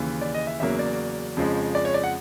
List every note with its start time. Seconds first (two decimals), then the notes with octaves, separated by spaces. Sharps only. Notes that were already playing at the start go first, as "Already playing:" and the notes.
Already playing: D#2 C#3 E3
0.21 D5
0.34 D#5
0.47 E5
0.60 E2 C#3 F#3 A#3 E5
0.79 D5
1.37 F2 C#3 F3 G#3
1.75 D5
1.85 C#5
1.94 D5
2.04 F#5